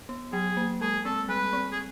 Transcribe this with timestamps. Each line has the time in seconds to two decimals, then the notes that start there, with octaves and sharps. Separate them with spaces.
0.09 B3
0.32 F#3 G#4
0.57 A#3
0.81 G#3 G#4
1.05 C4 A4
1.29 G3 B4
1.53 C4
1.72 G#4